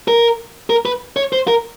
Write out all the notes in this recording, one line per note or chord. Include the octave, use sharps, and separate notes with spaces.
A#4
A#4
B4
C#5
C5
A#4